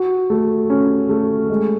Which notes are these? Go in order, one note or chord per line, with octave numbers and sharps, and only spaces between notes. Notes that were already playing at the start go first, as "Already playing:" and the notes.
Already playing: F#4
A3
C#4
A3
G#3